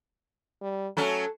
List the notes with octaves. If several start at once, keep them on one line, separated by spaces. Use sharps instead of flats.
G3
F#3 A3 C#4 A4